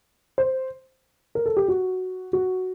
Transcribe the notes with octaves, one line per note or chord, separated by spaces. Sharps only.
C5
A#4
A4
G4
F#4
F#4